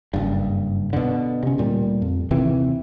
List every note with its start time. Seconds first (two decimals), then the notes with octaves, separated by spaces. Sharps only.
0.14 F#1 G2
0.93 B2 D3
1.43 C3 C#4
1.58 D2 A#2 G3
2.02 F2
2.31 D#2 C3 E3 C4